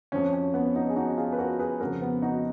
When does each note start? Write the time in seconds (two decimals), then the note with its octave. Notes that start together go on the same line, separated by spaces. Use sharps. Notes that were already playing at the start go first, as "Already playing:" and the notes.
0.12 F2 F3 C#4
0.33 C#4
0.54 B3
0.76 B3 D#4
0.90 G#4
0.96 D#4 F#4
1.18 F4 G#4
1.33 B4
1.38 F#4 A#4
1.59 G#4 B4
1.80 F2 C#3 F3 F#4 A#4
2.02 B3
2.22 D#4 F#4